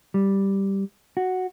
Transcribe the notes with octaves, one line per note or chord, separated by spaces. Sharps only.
G3
F#4